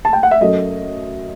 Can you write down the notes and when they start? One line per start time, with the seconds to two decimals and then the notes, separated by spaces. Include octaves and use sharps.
0.05 A5
0.13 G5
0.23 F#5
0.31 E5
0.41 F#2 F#3 A3 D#5